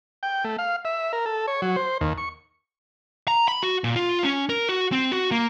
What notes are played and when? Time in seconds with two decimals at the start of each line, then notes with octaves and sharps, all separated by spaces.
0.23 G5
0.44 A3
0.58 F5
0.85 E5
1.13 A#4
1.26 A4
1.48 C#5
1.62 F#3
1.76 C5
2.01 D#2
2.18 C#6
3.28 A#5
3.48 B5
3.63 F#4
3.84 A#2
3.96 F4
4.24 C#4
4.49 A#4
4.69 F#4
4.92 C4
5.12 F#4
5.31 A#3